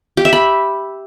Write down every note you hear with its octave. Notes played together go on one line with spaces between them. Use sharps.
G4
E5
B5